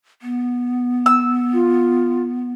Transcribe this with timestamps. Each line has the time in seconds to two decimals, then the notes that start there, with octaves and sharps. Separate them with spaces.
0.22 B3
1.06 E6
1.53 F4